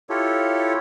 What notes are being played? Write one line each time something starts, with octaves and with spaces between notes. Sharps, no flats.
E4 F4 G4 A4 C#5